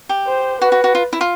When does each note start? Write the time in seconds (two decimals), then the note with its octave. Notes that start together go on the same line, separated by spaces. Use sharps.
0.09 G4
0.27 C5
0.61 F#4 B4
0.72 F#4
0.84 F#4
0.95 F4
1.13 E4
1.21 F4